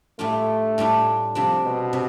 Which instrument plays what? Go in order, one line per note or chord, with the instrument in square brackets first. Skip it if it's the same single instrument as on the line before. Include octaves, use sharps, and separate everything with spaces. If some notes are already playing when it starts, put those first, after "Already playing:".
[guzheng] A2 G3 D4 F4 [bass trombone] A3
[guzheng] A2 G3 D4 F4
[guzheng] C3 G3 D4 [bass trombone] F3
[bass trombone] B2
[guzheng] C3